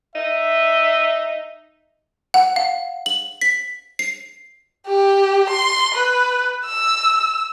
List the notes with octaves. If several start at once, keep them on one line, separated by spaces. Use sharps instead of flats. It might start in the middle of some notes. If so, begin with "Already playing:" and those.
D#4 E5
F#5
F5
F#7
B6
C7
G4
C6
B4
E6